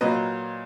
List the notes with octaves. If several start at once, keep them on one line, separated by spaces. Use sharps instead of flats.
A#2 F#3 A#3 B4 D#5